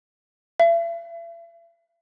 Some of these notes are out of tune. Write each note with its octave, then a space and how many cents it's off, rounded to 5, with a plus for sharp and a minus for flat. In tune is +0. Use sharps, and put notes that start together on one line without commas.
E5 +40